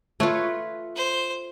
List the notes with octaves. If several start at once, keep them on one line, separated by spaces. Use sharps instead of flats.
A3 F4 B4 C#5
C5